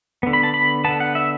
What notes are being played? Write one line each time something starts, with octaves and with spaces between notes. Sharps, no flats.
D3 B3
B5
A5
B5
D3 B3 A5
F#5
E5